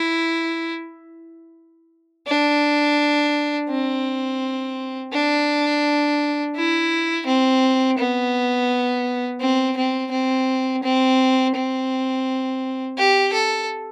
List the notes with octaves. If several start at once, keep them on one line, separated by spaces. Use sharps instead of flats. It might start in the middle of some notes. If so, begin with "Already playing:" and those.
Already playing: E4
D4
C4
D4
E4
C4
B3
C4
C4
C4
C4
C4
G4
A4